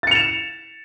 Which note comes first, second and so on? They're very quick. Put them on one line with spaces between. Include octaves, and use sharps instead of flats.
A6 C#7 F7 E7